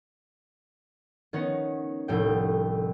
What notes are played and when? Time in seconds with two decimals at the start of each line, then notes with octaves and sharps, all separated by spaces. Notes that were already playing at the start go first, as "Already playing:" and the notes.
1.33 D#3 B3 C#4 D#4
2.08 F1 C2 A2 G5